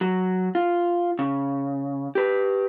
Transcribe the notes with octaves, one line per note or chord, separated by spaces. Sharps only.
F#3
F4
C#3
G4 B4